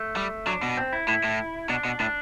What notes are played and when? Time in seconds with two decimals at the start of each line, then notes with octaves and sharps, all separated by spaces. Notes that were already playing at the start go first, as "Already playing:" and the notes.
Already playing: A3
0.16 G3
0.47 F#3 D4
0.63 B2
0.77 C4
0.93 E4
1.08 A2 E4
1.24 A2
1.69 B2 D4
1.85 B2
2.00 A2 D4